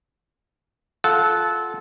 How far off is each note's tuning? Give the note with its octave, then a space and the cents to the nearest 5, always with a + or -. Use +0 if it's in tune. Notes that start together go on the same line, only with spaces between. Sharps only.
F4 +0 A4 -20 F#5 +0